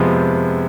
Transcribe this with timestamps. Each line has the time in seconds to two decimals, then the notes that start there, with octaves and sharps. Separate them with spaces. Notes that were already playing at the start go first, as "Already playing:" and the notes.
Already playing: F2 C3 F3 G#3 B3